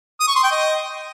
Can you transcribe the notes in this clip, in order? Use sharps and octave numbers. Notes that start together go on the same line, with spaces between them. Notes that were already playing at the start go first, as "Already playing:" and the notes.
D#6
C#6
C6
G5
D#5